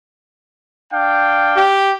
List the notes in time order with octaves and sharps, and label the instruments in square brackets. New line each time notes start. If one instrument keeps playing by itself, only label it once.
[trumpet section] D4 F5 G5
[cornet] G4